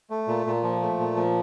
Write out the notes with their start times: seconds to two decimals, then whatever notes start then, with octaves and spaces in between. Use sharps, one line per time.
0.10 A3
0.28 A#2
0.46 A#2
0.63 F3
0.81 A3
0.99 A#2
1.16 F3